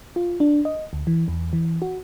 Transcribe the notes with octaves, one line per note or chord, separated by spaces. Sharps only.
F4
D4
D#5
D2
E3
E2
E3
F#4